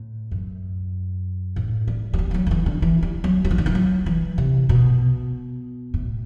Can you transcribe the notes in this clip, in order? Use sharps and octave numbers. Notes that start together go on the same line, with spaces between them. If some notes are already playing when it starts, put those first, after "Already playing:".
Already playing: A2
F#2
A2
G3
F#3
G3
G3
F#3
D3
E3
D3
E3
G3
F#3
F#3
E3
D3
E3
F#3
E3
C3
B2
A2